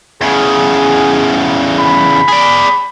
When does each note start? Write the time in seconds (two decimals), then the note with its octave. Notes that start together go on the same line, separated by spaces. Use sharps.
0.22 E2 C#3 G#4
1.79 B5
2.29 G#4 D5